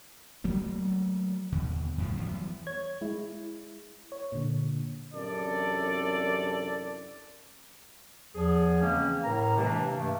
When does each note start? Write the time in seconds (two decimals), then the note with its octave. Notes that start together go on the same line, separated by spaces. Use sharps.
0.44 F#3 A3 A#3
1.52 D#2 B2 D3
1.98 F2 A2 C#3 F3
2.17 E3 F#3 G3 B3
2.67 C#5 G#6
3.01 G#3 E4
4.12 C#5
4.32 A#2 D3
5.14 F#2 C3 E3 D4 A4 D5
8.35 E2 F3 G#4
8.81 C#3 E3 G#3 A#3 C4 C#4
9.24 A2 A#4 B4 A#5
9.57 C3 E3 G#3 A#3 D4
9.97 G2 C3 A3